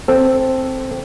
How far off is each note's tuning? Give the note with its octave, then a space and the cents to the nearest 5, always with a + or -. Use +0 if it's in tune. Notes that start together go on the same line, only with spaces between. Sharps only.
C4 +0 A4 +0